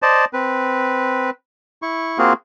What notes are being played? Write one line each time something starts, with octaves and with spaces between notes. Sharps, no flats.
C5 D5 D#5 A5
C4 B4
E4 C#6
A#3 C4 F4 F#4 G#4